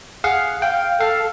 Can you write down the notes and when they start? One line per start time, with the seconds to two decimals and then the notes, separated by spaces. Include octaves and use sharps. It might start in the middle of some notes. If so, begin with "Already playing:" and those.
0.24 G#4 F5 F#5
0.62 F5 G5
1.00 A4 F5